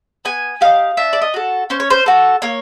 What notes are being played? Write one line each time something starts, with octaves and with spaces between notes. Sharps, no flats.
B3 G#5
D#4 G4 F5
D4 E5
D5
D#5
F#4 A4
C#4 C5
C#5
C5
F#4 A4
A#3 C#5